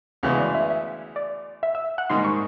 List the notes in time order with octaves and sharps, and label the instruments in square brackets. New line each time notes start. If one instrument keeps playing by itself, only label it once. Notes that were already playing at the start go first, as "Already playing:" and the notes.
[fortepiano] D2 C#3 E3 G#3 B3 [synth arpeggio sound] F#5
[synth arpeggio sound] D5
E5
E5
D5
E5
E5
F#5
[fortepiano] G#2 D#3 G3 A#3 D#4 [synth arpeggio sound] C6
[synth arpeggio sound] C#6